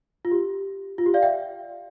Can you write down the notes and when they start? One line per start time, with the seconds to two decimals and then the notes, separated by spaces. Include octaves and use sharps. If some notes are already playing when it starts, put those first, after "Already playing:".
0.25 F4
0.31 G4
0.98 F4
1.06 G4
1.14 D5 F5
1.23 E5 G5